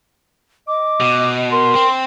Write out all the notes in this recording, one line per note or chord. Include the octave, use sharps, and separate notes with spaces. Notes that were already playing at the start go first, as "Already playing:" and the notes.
D#5 D6
B2
A#4 C6
C4